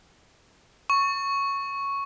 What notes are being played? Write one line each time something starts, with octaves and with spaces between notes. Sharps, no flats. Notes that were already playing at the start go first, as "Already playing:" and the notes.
C#6